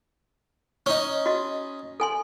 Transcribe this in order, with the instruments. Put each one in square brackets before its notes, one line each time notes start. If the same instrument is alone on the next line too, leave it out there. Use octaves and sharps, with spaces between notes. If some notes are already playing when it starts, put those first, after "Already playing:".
[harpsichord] C#4 D#4 [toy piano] C#6
[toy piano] F#4 D#5
A4 G#5 C6